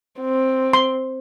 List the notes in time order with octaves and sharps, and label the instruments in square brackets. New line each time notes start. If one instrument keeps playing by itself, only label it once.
[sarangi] C4
[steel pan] C6